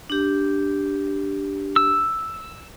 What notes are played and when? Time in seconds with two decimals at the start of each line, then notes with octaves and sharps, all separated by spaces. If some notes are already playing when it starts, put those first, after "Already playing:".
0.10 D4 G4
1.76 E6